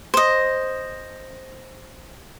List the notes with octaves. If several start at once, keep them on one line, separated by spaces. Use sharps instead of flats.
C5 D#5